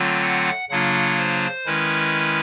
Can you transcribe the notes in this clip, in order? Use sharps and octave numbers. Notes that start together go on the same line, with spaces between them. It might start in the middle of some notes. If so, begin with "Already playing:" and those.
Already playing: D3 F#3 A3 C4 F4
F#5
C#3 F#3 A#3 D4 F4 F#5
C5
D#3 G#3 C#4 E4 B4